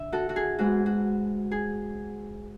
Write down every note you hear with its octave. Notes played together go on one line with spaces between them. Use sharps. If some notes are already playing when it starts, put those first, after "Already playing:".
Already playing: D3 E5
F#4 A4
F#4
G#4
G#2 G#3 B3 F#4
F#4
G#4